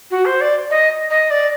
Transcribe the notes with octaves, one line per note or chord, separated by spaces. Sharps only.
F#4
C5
D5
D#5
D#5
D5